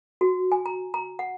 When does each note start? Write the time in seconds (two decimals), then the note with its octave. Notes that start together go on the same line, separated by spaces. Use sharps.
0.21 F#4
0.52 G#5
0.66 A#5
0.94 A#5
1.19 F#5